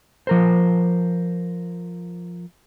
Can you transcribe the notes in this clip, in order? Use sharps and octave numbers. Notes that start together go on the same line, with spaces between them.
F3 A#4 C5